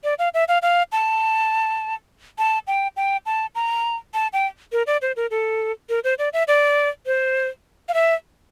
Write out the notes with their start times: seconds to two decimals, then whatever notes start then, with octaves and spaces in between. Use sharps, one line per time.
0.04 D5
0.19 F5
0.34 E5
0.48 F5
0.62 F5
0.92 A5
2.38 A5
2.67 G5
2.97 G5
3.26 A5
3.55 A#5
4.14 A5
4.33 G5
4.72 A#4
4.87 D5
5.02 C5
5.16 A#4
5.31 A4
5.89 A#4
6.04 C5
6.19 D5
6.33 E5
6.48 D5
7.06 C5
7.89 F5
7.94 E5